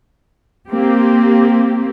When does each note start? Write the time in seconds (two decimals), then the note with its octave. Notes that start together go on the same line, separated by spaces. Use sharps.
0.68 A#3 C4 G4